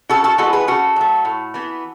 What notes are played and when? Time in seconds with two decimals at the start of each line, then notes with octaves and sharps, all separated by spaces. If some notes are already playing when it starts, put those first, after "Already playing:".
0.09 C#3 F#4 A4
0.24 F#4 A4
0.38 E3 G#3 B3 F#4 A4
0.53 G#4 B4
0.67 C#3 F#4 A4
0.96 F#3 A3
1.25 A2
1.54 E3 B3